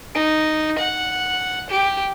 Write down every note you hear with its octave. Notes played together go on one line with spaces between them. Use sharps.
D#4
F#5
G4